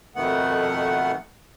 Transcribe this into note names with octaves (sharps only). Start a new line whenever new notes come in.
F2 B2 D#3 A3 B3 F#5